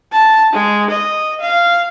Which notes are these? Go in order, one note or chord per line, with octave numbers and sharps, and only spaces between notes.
A5
G#3
D#5
F5